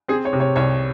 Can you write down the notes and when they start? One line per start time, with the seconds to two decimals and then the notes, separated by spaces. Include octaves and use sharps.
0.08 C4 G#4
0.25 C#5
0.33 C3
0.40 C#5
0.56 C2 C#5